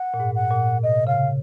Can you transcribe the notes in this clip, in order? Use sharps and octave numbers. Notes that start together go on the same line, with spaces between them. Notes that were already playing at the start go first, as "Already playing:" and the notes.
Already playing: F#5
A#2
G#2
F#5
A#2
C3 D#5
C#3 F5